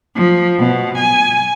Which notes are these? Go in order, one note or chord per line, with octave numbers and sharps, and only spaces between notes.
F3
B2
G#5